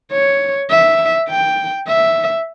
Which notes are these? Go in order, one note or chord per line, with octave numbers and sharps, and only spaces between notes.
C#5
E5
G5
E5